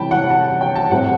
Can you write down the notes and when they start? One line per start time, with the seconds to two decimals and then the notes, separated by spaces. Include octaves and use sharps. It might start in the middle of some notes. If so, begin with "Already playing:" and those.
Already playing: C3 E3 G3 G5 A5 B5
0.11 F#5
0.30 A5
0.61 G5
0.75 A5
0.91 A2 G3 C4 F#5